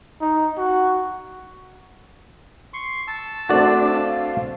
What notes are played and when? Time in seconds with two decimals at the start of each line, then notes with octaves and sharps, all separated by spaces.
0.21 D#4
0.58 F#4
2.74 C6 C#6
3.07 A5 E6
3.49 A3 C4 D4 F#4 D5
3.93 F5